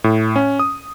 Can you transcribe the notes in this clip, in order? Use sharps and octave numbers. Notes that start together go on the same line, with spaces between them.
A2
C#4
D#6